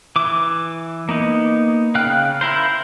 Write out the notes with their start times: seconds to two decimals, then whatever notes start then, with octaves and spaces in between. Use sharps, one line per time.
0.16 E3 D6
1.09 A#3 B3 D#4
1.95 C#3 F5 G5 F6 F#6
2.41 E4 A#4 C5